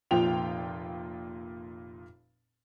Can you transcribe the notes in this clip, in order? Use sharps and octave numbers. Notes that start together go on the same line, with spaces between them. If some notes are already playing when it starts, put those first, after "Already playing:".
F1 A#2 F3 F4 G5 F7